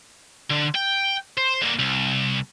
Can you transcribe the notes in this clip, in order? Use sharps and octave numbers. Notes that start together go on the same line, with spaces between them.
D3
G5
C5
D3 A#3
C2